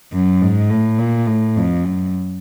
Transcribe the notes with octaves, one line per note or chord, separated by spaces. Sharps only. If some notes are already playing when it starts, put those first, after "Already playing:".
F#2
G#2
A2
A#2
A2
F2
F#2